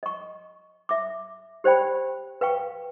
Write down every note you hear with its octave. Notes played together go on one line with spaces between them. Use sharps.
D#5 C#6
E5 D6
G4 C5 D5 G5 B5
B4 F5 G5 C#6